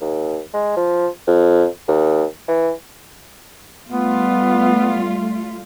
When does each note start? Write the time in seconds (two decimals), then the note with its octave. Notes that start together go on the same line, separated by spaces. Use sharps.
0.01 D#2
0.53 G#3
0.76 F3
1.27 F2
1.88 D#2
2.48 E3
3.88 G3 A3 B3 F4